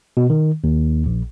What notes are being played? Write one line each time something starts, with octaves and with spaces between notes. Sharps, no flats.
B2
D#3
D#2
A#1